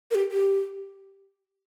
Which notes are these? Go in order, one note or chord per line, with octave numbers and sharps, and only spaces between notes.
A#4
G4
G4